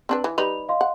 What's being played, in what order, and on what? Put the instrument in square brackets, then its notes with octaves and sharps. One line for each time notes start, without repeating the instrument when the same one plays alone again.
[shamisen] C4 D4 B4
E3
[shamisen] G3 D#4 B4 [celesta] F7
[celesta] D#5 F5 C6
[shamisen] F#5